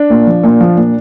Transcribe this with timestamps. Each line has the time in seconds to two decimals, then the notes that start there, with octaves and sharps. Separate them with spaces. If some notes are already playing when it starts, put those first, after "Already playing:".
Already playing: D4
0.10 A#2
0.27 F3
0.44 A#2
0.61 F3
0.77 A#2